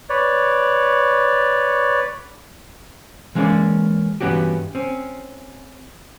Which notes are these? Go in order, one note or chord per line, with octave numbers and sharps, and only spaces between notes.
B4 C#5 D5
E3 G#3 A#3 C#4 C#5 D5
G2 E3 B3 C#4 F#4 G4
C4 C#4